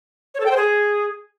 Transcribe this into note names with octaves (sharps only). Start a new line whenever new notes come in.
C#5
A4
G5
C5
G#4